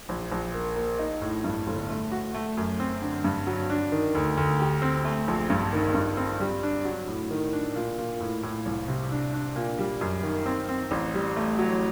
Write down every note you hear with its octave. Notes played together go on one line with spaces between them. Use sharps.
A#1
A#1
A#3
A#3
D#4
A2
G2
G1
A3
F#4
A3
F#2
C4
D3
G2
F#3
D4
D#3
D2
D2
G4
C4
A3
A#1
G2
D#3
G2
C4
G3
D4
F#3
A2
D#3
D4
A#2
A#2
A2
A2
C2
C3
D4
D4
A#2
G3
F#2
D#3
C4
C4
A1
G3
A3
F#3